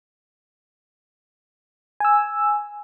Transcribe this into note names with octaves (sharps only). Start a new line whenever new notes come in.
G#5 E6